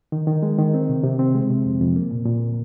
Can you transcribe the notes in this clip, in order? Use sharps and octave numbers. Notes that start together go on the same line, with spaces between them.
D#3
D#3
G#3
D#3
C4
C3
C3
C4
G#3
C3
F2
F2
A#3
A#2
A#2